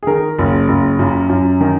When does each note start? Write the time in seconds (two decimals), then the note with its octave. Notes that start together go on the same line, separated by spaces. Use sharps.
0.03 G#4
0.07 D#3 A#4
0.38 F#1
0.68 F#1
0.99 F#2
1.29 F#2
1.61 D#3